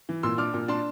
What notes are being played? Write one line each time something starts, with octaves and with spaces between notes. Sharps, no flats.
E3
A#2 C6 E6
D4 D6 F6
A#2
D4 A5 C6